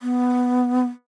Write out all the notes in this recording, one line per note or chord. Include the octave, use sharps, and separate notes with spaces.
B3